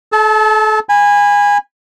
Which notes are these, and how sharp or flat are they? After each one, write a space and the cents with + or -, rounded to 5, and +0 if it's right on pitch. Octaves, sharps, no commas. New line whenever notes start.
A4 -35 A5 +0
G#5 -20 B5 -5